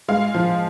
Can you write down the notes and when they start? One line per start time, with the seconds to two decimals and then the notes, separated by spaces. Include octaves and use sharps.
0.08 G#3 F5
0.34 F3